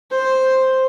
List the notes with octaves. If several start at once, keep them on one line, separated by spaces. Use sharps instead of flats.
C5